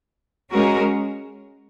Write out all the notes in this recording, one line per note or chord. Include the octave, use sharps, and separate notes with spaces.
G#3 C#4 F#4 A#4